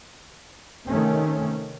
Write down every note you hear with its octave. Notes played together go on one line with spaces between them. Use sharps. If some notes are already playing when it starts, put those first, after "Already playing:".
C3 D#3 A3 C#4